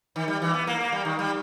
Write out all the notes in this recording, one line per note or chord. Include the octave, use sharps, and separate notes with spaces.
D#3
G3
E3
B3
A#3
A#3
G3
D#3
G3